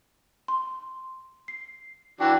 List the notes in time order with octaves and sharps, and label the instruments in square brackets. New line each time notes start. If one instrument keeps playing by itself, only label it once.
[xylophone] C6
C7
[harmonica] E3 D4 F#4 [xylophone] G5